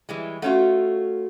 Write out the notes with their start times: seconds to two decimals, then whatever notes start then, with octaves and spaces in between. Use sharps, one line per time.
0.09 E3 G3 G#3
0.42 A3 C#4 F4 F#4 F#5